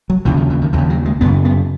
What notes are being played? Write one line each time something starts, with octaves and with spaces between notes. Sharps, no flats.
F#3
D#2 C#3 E3
D#3
E3
D#3
D#2 C#3 E3
F#3
G#3
F#2 C#3 B3
B3